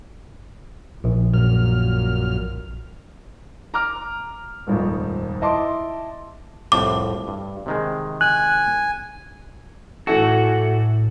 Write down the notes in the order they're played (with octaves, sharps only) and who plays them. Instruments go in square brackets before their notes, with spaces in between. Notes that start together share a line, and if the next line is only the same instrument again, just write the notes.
[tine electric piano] A#1
[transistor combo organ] F#2 A#2 F6
[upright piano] A#5 D6 F6
D#1 G#1 F2
E4 D#5 A5 C6 D6
[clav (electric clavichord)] C2 F2 A2 [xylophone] D6
[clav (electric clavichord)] G2
C3 D#3 G#3
[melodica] G#5 [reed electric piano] F#6
[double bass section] A2 [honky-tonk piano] E3 A3 A4 [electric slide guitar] F#4